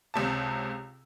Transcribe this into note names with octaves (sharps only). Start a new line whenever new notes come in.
C#2 C3 A5